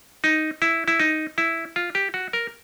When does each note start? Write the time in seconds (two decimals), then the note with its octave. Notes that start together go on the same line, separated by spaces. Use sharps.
0.24 D#4
0.62 E4
0.88 E4
1.00 D#4
1.38 E4
1.76 F4
1.95 G4
2.14 F#4
2.33 A#4